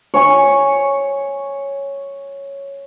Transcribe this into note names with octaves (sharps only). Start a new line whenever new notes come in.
C#5 G#5 C#6